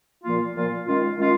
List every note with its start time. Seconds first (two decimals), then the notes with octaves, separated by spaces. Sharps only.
0.24 A#2 F3 A#3 F4
0.55 A#2 F3 A#3 F4
0.87 D#3 G#3 C#4 F4
1.17 D#3 G#3 C#4 F4